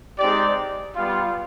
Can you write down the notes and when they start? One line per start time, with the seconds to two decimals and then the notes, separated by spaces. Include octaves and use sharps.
0.18 G#3 C4 D#4 G4 D5
0.96 G3 B3 F4